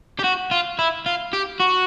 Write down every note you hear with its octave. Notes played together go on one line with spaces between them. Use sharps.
G4
F#4
F4
E4
F4
G4
F#4